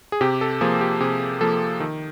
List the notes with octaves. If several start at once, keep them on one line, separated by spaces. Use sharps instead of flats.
G#4
C3 G4
A4
F3 A#3 G#4
G4
C3 G#4
F3 A#3 A4
D#3